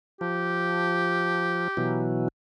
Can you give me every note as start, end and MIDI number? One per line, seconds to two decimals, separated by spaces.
0.21 1.68 53
0.21 2.09 67
1.77 2.28 47
1.77 2.28 52
1.77 2.28 54